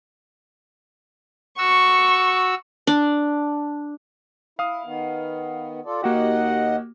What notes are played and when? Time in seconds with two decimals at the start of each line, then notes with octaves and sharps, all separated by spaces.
1.58 F#4 C#6 E6
2.87 D4
4.59 E4 F5 D#6
4.85 D#3 B3
5.85 F4 A4 D5
6.02 D#2 A#3 F#4 G4 D#5 F#5